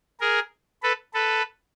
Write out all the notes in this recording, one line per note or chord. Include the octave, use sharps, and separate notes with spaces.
G#4 A#4
A4 B4
A4 B4